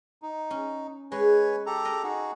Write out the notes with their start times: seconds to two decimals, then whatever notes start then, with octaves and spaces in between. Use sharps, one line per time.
0.22 D#4
0.51 C#4
1.12 G#3 B4 C#5 G#5
1.66 G4 A4 A#5
1.85 A#4 D#5
2.03 D#4 F#4 G#4